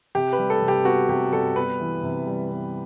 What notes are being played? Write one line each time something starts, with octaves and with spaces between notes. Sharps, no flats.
C3 G4
B4
G3
A4
C3
G4
B3 F#4
C3 G4
G3 A4
B3 B4
E3
C3
G3
B3